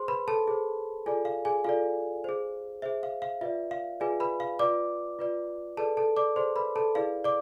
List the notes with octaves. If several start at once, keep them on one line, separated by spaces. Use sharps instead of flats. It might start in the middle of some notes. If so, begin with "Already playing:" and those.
Already playing: G#4 C5 C6
B4 B5
A4 A5
G#4 C5
F4 G#4 A4 D5 G#5
F5
G#4 G#5
F4 A4 D5 F5
G#4 C5
G#4 C5 E5
F5
F5
F4 B4 D5 E5
F5
F4 G#4 B4 D5 G#5
B4 B5
F5
F4 B4 D5 D6
F4 B4 D5
G#4 A4 B4 D5 A5
A4 A5
D5 D6
G#4 B4 C5 D5 C6
B4 B5
A4 A5
E4 G#4 B4 D5 F5
D5 D6